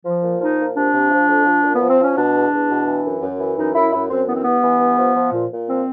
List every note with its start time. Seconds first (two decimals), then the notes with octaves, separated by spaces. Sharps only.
0.05 F3
0.23 A#2
0.41 F3 D#4
0.59 A#2
0.75 C3 D4
0.93 C3
1.10 F3
1.29 F2
1.46 F3
1.64 A#2
1.75 B3
1.81 F3
1.89 C4
1.99 F3 C#4
2.16 B2 D4
2.34 E2
2.52 E2
2.70 B2
2.87 E3
3.05 F#2
3.22 F#2
3.39 E3
3.57 F#2 D#4
3.74 F#2 E4
3.92 F#2 E4
4.10 F#2 C4
4.27 E3 B3
4.35 C4
4.43 G2 B3
4.63 E3
4.80 G2
4.99 F3
5.16 F3
5.33 A#2
5.50 A#2
5.68 F3 C4